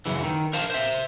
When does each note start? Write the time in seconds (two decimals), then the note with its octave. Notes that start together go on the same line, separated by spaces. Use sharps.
0.06 F#2 C#3 E3
0.23 D#3
0.53 A#4 C5 F5 A5
0.70 C5 E5